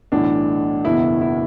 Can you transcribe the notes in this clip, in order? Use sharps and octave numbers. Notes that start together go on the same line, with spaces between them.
B1 A2 E3 D4
F#1 E2 B2 E4
E4